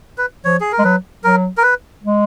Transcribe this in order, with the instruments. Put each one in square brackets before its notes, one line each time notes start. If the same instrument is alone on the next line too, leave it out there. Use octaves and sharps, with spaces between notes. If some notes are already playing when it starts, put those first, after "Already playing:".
[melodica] B4
[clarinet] F3 [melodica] C#5
[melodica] G#4
A#4
[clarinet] G#3
[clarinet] F#3 [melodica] B4
[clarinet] F#3 [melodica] A#4
[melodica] A#4
B4
[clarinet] G#3